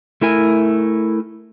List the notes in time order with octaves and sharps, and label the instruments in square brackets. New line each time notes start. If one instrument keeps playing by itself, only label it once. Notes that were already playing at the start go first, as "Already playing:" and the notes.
[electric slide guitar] A3 E4 A#4 G#5